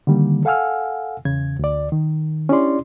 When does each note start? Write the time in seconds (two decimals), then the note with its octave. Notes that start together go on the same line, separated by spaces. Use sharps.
0.07 D3 D#3 G3 A#3
0.45 A4 F5 F#5 G#5 E6 F6
1.25 E2 C#3 G#6
1.59 D2 D5
1.92 D#3
2.49 C#4 D4 E4 G4 D5 C6